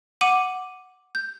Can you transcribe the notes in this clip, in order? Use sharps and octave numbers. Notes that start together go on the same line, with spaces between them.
F#5 D6 D#7 F#7
G6